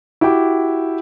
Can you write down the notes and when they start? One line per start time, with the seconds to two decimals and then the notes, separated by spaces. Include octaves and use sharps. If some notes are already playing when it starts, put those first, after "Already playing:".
0.21 E4 F#4 G4 G5 D6